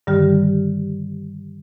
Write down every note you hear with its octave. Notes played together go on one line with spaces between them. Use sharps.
G2 D3 D#3 G3 G4 F6